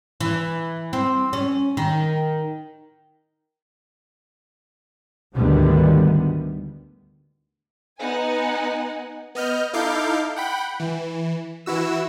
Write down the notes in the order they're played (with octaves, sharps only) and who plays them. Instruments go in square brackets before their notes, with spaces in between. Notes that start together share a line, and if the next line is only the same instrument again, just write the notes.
[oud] E3
C4
C#4
D#3
[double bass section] D2 G#2 D3 D#3 G3 B3
[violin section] B3 D#4 F#5 G#5
[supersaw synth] B3 D#5 F6 G6
D#4 E4 A4 F5 D6 G6
F#5 G5 B5
E3
E3 E4 F#4 E6